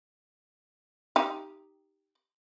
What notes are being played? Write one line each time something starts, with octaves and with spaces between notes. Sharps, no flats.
D#4 G4